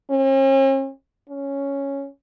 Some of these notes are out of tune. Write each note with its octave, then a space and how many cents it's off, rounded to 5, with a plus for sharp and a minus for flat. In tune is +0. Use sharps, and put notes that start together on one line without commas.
C#4 -45
C#4 +0